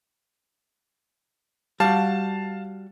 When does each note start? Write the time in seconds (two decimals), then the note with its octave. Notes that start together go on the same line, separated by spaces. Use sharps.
1.80 G3 F#4 F5 A5